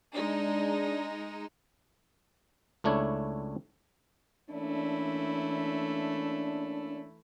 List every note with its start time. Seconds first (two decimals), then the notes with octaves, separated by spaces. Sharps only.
0.15 G#3 D4 D#4
2.84 C#2 A3 D4 E4 C#5
4.50 E3 A3 A#3 C#4 D4 E4